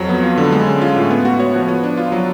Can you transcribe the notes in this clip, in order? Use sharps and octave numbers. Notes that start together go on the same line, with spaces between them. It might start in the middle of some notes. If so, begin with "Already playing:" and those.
Already playing: F2 F#3
B3
F4
D3
G#3
C#4
F4
A2
B3
F#4
C#5
F3
B3
D4
F4
F#3